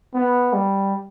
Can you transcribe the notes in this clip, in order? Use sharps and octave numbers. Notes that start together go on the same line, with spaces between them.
B3
G3